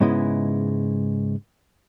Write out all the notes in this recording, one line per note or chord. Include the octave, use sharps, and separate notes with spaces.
G#2 C#3 G#3 B3 E4